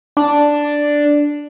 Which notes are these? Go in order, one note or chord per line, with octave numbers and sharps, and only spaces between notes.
D4